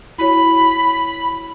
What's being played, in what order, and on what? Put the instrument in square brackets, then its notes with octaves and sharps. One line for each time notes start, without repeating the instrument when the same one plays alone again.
[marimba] E4 F#4 C#5 [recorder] B5